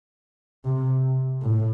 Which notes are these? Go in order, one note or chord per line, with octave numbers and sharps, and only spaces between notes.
C3
A2